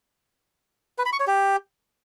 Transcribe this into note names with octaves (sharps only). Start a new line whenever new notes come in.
B4
B5
C#6
C#5
G4